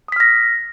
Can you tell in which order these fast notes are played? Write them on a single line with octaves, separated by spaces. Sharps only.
D#6 B6 F6 A#6